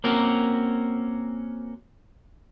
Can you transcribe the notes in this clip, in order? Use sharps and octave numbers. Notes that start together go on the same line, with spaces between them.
A#3 C4 C#4 F#4 A#4